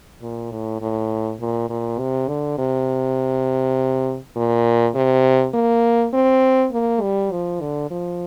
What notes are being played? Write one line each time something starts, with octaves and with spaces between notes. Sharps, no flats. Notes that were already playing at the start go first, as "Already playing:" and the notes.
A#2
A2
A2
A#2
A#2
C3
D3
C3
A#2
C3
A#3
C4
A#3
G3
F3
D3
F3